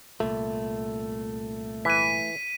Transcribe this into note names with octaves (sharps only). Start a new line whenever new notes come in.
C2 A#2 A3
E3 B6 D#7